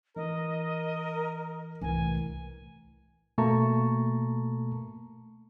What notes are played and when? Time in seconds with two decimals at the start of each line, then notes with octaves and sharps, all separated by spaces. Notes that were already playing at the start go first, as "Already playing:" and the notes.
0.16 E3 A#4 D#5
1.81 C2 A2 E3 A#4 G#5
3.38 B2 A3 A#3 A5 A#5 C#6